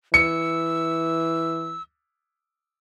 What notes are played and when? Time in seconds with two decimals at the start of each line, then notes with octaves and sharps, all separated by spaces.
0.14 E3 E6 C#7